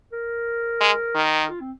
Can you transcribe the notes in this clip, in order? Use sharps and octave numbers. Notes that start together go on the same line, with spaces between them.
A#4
G#3
D#3
F4
C4